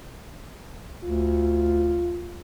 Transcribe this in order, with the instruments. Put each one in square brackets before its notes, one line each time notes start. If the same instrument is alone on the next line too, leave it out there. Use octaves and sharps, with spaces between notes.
[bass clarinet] D2 [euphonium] F4